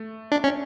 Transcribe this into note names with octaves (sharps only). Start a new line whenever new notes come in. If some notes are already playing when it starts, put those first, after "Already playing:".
Already playing: A3
D4
C#4